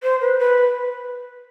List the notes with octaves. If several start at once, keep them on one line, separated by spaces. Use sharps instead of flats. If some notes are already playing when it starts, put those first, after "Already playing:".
C5
B4
B4